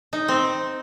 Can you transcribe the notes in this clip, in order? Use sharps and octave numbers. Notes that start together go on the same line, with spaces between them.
D#4
C4